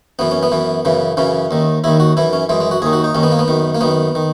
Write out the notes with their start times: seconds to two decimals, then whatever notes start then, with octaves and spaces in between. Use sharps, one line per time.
0.19 F#2 E3 B3
0.31 C#4
0.43 B3
0.52 F#2 E3
0.85 F#2 C#3 E3
1.17 F#2 C#3 E3 C#4
1.51 D#2 D#3
1.84 D#2 D#3 E4
2.00 F#4
2.17 F#2 E3 E4
2.33 C#4
2.49 F#2 E3 G#3
2.60 G#3
2.71 F#4
2.82 D#2 G#4
2.86 D#3
2.93 F#4
3.04 D#4
3.15 D#2 D#3 C#4
3.23 B3
3.32 A#3
3.39 B3
3.48 F#2 D#3
3.75 A#3
3.81 F#2 D#3 B3
4.15 D#3